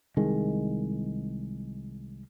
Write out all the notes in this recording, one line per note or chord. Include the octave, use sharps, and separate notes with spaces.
C2 D#3 G#3